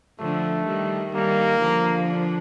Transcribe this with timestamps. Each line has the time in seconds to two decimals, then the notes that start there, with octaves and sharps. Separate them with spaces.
0.19 D3 F3 A3
0.67 D#3 G3
1.14 D#3 G3 A#3
1.61 D3 F3
2.09 D4